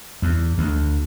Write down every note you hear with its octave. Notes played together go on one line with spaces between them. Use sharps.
E2
D2